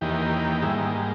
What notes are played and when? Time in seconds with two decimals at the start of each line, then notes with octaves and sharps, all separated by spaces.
0.01 E2 D#3 A#3 G4
0.62 G#2 G3 A#3 E4
0.77 D#4